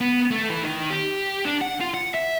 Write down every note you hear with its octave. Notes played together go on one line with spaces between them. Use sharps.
B3
A3
E3
D#3
G4
D4
F#5
F4
F#5
E5